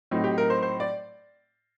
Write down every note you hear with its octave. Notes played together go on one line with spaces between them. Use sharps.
A2 F#3 C4 D#4
G4
A#4
C5
C5
D5